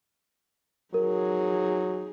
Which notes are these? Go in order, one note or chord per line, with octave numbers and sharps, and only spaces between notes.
F#3 D#4 G#4 A#4